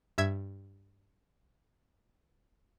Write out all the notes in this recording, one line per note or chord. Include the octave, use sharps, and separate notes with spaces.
G2 E5 G#6